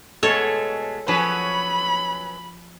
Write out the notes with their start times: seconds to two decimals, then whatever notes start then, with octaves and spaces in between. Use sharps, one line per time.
0.23 B2 G#3 A3 A4 C#5
1.08 F3 F#3 C#4 B4 B5